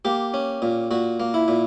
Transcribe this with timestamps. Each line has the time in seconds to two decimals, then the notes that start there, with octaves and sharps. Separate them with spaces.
0.05 A#3 G4
0.34 C#4
0.62 A#2
0.91 A#2 F#4
1.20 A#3
1.34 E4
1.48 A#2